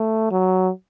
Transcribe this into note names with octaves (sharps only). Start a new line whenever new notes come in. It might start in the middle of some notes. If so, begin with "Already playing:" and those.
Already playing: A3
F#3